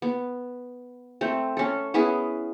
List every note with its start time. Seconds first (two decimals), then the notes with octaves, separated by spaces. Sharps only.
0.02 B3
1.21 A3 C4
1.57 C#4 A4
1.94 B3 C#4 E4 G#4